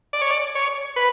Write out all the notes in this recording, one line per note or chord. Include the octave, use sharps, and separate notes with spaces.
D5
C#5
D5
C#5
B4